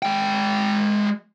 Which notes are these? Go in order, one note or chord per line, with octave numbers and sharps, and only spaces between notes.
G#3 G5